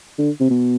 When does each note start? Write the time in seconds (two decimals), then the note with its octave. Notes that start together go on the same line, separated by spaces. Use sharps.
0.19 D3
0.40 C3
0.50 B2